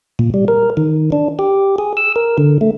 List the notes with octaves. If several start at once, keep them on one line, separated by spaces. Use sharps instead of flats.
A#2
G3
A#4
D#3
D4
G4
G#4
E6
A#4
D3
A3